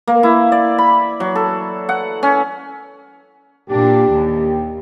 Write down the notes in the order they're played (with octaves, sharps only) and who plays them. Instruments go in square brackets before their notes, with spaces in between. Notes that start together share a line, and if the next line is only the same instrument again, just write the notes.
[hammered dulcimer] A#3
E4
D5
B5
F#3
A4
F#5
C#4
[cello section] A#2 D4 [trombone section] G4
[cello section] D#2